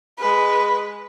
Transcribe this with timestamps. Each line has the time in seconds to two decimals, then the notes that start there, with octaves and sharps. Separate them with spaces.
0.18 G#3 B4